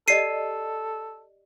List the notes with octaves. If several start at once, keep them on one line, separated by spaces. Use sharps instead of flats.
G4 A4 D5 D#5 C7 D#7